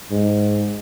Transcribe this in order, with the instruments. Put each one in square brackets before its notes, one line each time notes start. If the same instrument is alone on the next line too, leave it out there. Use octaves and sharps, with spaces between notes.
[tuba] G#2